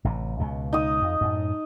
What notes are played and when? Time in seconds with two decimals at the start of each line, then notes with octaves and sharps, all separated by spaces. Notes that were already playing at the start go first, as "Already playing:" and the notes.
0.05 A1 C3
0.40 C#2 B2
0.73 D#4 D#6
1.02 F2
1.21 F#2 A2